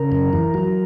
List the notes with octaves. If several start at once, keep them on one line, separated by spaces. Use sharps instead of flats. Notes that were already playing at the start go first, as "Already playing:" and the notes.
Already playing: C#3 A#4
F#2
E3
F#3